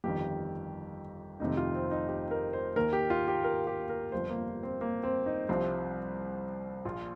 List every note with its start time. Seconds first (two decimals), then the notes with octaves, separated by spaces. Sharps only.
0.04 G1 F2 D#3 G4
1.40 F1 F2 C3 D#3 D#4
1.57 F4
1.75 C4
1.91 D#4
2.08 G4
2.31 A#4
2.53 C5
2.76 D#2 D#3 A#4
2.93 G4
3.10 F4
3.28 G4
3.44 A#4
3.67 G4
3.89 A#4
4.12 G1 F2 F3 C5
4.30 A#3
4.63 C4
4.81 A#3
5.03 C4
5.26 D#4
5.49 C2 C3 F3 C4
6.85 A#1 A#2 F3 F4